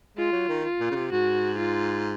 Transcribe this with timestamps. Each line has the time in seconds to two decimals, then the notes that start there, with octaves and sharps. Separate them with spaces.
0.17 G#3 F4
0.33 F#3
0.49 D#3
0.65 F4
0.80 A#2
0.91 C#3
0.95 C3
1.12 G#2 F#4
1.58 F4